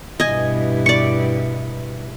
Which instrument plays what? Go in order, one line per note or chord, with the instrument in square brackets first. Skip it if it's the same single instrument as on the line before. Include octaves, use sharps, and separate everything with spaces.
[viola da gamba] G2 B2 E4 [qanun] D#5 G#5
[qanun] D5 C#6